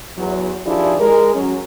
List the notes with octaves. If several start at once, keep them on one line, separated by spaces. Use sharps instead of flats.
E2 F#3
D#3 F3 D4 E4 G4 G#4
G#3 A#4
F#3 C#4